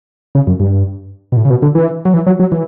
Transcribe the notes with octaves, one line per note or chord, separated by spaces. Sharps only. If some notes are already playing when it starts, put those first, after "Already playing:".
C#3
F#2
G2
B2
A2
C#3
B2
D3
E3
F#3
E3
F#3
F#3
E3